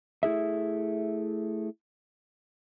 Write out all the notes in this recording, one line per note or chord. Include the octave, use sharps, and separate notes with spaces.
A3 E4 G#4 E5